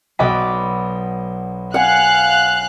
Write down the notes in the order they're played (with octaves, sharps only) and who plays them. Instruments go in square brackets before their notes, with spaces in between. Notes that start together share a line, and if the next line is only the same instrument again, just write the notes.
[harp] B1 D5 B5 [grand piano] F#4 D#5 G5
[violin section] F5 F#6 [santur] F#5 G#5